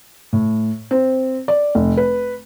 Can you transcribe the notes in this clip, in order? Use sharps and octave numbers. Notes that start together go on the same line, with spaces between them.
A2
C4
D5
F1
B4